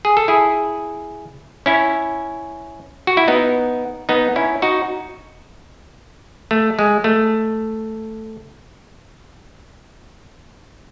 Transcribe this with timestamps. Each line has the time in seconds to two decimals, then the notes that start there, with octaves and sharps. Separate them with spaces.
0.05 G#4
0.17 A4
0.28 E4 G#4
1.66 C#4 E4
3.07 F#4
3.17 E4
3.28 B3 D#4
4.09 B3 D#4
4.36 C#4 E4
4.62 D#4 F#4
6.51 A3
6.79 G#3
7.04 A3